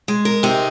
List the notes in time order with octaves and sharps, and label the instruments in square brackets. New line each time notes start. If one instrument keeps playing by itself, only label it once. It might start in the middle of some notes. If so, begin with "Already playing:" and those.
[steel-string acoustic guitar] G#3
A#4
[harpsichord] C3 [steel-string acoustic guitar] D#4